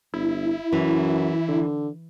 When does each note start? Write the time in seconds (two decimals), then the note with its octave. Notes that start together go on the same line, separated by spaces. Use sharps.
0.14 G1 E4
0.72 F#2 E3
1.48 D3